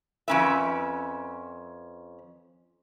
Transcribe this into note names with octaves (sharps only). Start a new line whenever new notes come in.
F2 G3 C#4 B4 E5